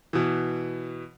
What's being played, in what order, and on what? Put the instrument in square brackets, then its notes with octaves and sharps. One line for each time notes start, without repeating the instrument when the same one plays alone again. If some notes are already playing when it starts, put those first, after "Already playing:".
[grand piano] B2 E3